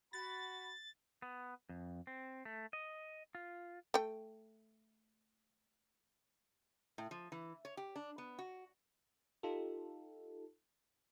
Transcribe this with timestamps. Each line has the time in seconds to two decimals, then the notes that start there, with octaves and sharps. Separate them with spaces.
0.13 F#4 B5 A6
1.22 B3
1.69 F2
2.07 C4
2.45 A3
2.73 D#5
3.35 F4
3.94 A3 G5
6.98 A2
7.11 F3
7.32 E3
7.65 C#5
7.77 G4
7.96 D4
8.18 B3
8.39 F#4
9.43 D#4 F4 G4 A4